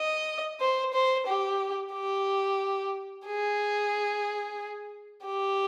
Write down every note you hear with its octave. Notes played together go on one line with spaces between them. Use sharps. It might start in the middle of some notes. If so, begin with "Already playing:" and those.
Already playing: D#5
C5
C5
G4
G4
G#4
G4